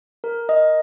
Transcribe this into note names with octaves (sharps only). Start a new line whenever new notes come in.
A#4
D#5